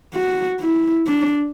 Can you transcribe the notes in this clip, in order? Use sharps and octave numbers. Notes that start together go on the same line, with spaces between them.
F#4
E4
D4